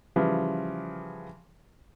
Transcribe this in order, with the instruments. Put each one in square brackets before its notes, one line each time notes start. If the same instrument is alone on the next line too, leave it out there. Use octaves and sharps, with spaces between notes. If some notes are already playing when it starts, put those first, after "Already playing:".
[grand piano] C#3 E3 F3 G3